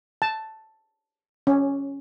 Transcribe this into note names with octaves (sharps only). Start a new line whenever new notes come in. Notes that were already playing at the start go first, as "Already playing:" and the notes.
A5
C#4